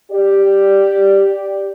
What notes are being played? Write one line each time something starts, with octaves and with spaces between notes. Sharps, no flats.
G4 D5